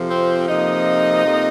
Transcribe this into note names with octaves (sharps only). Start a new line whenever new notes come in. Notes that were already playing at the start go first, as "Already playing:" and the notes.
Already playing: F2 C3 F3
C4 C5
F2 C3 F3 A#3 D#4 D#5
F2 C3 F3 A#3